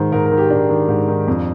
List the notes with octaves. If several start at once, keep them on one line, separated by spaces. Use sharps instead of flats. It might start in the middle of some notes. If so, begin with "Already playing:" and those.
Already playing: G#2 D#3 C5
G#2 A#4
A#4
D#3
G4
G#2 D4
D#3
G#2
D#3
F2